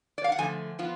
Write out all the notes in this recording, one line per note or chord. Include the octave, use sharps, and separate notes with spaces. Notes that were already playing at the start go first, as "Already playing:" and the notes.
D5
F5
F#5
D3 F3 A3 G#5
F3 B3 F4